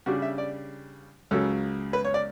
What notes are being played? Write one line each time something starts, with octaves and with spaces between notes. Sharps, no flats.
C#3 G3 D4 F#4
E5
D5
C#2 C#3 F#3 A4
B4
C#5
D5